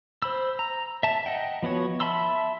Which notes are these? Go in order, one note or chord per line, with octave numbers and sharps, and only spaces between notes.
C5 B5 E6
A#5
E5 A5
D#5 F#5 G5
F3 B3 F#4 C#5
E5 A5 B5 C6 E6